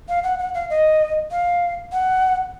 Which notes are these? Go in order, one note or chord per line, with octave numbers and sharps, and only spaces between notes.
F5
F#5
F#5
F5
D#5
F5
F#5